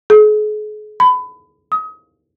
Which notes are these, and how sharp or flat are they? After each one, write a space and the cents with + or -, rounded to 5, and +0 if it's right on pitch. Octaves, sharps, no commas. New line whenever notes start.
G#4 +40
B5 +25
D#6 +30